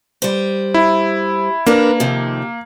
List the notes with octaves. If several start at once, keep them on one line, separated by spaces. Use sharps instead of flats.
G3 C5
E4
A#3 D4 A#4 B4
F2 C3 D#3